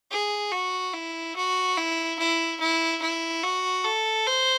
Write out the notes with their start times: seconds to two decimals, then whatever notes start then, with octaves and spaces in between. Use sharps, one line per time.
0.11 G#4
0.52 F#4
0.94 E4
1.36 F#4
1.77 E4
2.19 E4
2.60 E4
3.01 E4
3.43 F#4
3.84 A4
4.27 C5